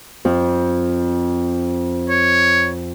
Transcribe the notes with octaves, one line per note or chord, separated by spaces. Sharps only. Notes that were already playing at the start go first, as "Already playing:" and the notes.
F2
C#5